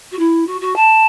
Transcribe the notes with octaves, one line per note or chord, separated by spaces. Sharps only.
F#4
E4
F#4
F#4
A5